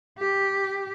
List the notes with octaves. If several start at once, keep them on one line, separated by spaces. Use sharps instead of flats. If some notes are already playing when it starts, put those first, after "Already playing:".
G4